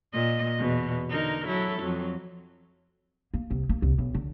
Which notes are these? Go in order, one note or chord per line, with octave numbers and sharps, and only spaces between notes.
A#2 D#5
E2 B2
D3 D#4 A#4
F#3 E4 A4
F2 F#3
A#3
C2
A#3
C2
B1
D3